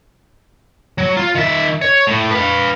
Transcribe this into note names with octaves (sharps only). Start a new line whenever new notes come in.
F#3
F4
D#3 E5
C#5
A2
B4 F5